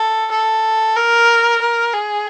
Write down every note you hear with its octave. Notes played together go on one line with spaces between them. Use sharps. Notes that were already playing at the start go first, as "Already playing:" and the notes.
Already playing: A4
A4
A#4
A#4
G#4